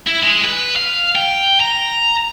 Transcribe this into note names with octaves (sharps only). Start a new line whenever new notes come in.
E4
G#3
B4
F5
G5
A#5